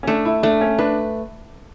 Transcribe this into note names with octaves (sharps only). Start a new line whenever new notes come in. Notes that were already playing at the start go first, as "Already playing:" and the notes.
C#4
A3 D4
E4
A3 D4
C#4
D4 B4